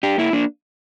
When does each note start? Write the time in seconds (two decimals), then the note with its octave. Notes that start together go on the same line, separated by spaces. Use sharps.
0.03 D4 G4
0.18 A#3 E4
0.33 A#3 D4